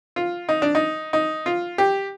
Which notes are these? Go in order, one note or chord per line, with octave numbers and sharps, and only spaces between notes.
F4
D#4
D4
D#4
D#4
F4
G4